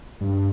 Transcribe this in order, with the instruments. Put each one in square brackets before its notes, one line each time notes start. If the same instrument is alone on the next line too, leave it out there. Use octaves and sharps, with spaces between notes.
[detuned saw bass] G2